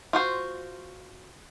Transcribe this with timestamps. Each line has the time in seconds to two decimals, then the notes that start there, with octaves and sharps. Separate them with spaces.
0.13 F4 F#4 C5